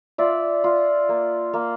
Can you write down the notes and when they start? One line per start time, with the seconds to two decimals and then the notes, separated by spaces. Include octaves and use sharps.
0.18 F4 D5 E5
0.64 F4
1.09 A#3
1.53 A#3